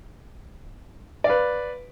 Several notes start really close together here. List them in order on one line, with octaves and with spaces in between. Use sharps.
D5 F5 B4